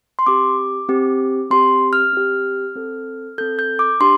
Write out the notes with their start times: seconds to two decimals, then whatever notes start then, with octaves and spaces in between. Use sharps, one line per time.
0.19 C6
0.26 C4 G4 D6
0.89 C4 G4
1.50 C4 G4 C6
1.93 F6
2.13 C4 G4
2.75 C4 A4
3.38 C4 A4 G6
3.59 G6
3.79 D6
4.00 D4 G4 C6